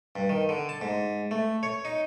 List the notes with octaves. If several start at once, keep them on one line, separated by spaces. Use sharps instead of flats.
G2
D#3
D3
A5
G#2
A3
C#5
D#4